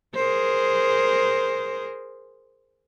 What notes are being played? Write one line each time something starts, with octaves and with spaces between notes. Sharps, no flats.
G#4 A#4 C5